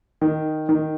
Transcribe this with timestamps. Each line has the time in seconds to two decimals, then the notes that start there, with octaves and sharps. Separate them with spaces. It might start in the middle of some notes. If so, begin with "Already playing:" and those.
0.21 D#3
0.69 D#3